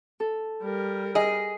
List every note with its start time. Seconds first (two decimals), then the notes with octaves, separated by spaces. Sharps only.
0.20 A4
0.62 G3 A#4
1.15 G#4 D#5